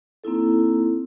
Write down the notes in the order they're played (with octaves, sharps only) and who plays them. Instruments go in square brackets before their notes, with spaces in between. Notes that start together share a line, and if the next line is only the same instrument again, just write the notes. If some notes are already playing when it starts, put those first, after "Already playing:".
[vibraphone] A#3 C4 D#4 E4 A4